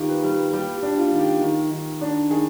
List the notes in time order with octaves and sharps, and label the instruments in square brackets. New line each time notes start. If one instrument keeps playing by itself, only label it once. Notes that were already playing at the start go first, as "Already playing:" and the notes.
Already playing: [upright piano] D#3 [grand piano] F4 G4
[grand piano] B4
[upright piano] G3
[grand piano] B4
[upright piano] G3 [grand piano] G4
[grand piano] G4
[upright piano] D4
[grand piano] F4
[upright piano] D#3
[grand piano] G4
[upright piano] D#3
D#3
D4
[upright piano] D#3 [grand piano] G#4